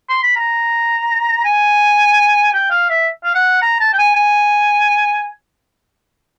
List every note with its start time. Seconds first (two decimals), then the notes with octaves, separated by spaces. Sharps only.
0.09 C6
0.23 B5
0.36 A#5
1.45 G#5
2.53 G5
2.70 F5
2.89 E5
3.24 F5
3.35 F#5
3.62 A#5
3.80 A5
3.93 G5
3.98 G#5
4.15 G#5